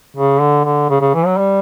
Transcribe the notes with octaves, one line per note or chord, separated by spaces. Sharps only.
C#3
D3
D3
C#3
C#3
E3
F#3
G3